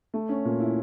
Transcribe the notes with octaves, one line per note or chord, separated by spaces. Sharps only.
A3
C#4
A#2
E4